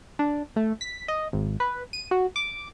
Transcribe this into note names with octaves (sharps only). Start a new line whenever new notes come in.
D4
A3
B6
D#5
G#1
B4
D#7
F#4
D6